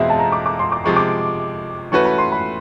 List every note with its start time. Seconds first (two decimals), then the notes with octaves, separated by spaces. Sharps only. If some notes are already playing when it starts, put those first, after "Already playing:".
Already playing: E2 B2 G#3 C4 E4 E5 F5
0.10 A5
0.19 A#5
0.32 D6
0.46 D6
0.59 C6
0.72 D6
0.84 C3 F3 G#3 C#6
0.96 D6
1.92 E3 A3 C#4 F#4 B4 C#6
2.05 B5
2.18 C6
2.32 B5